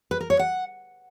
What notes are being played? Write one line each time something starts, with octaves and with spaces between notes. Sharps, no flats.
B4
A#4
C#5
F#5